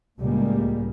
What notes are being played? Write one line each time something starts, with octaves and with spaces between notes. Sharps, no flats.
C#2 A2 G3 G#3 A#3